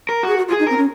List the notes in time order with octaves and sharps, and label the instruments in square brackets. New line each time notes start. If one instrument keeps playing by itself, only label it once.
[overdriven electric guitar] A#4
[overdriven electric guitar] F#4 [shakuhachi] G#4
[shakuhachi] F#4
F4
[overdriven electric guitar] G#4
[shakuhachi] D#4
[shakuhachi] C4 [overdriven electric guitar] A#4
[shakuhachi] C#4